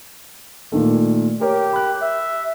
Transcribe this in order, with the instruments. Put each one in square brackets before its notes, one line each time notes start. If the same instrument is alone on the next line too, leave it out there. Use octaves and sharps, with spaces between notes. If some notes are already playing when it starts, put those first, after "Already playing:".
[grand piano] A#2 D#3 A3
[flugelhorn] G4 [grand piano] A#4 C#5
[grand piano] B5 F#6
[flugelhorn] E5